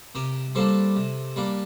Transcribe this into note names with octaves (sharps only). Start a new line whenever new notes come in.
C3 G4 A#4
G3 A#3 D4 A4 C5
C3
G3 A#3 D4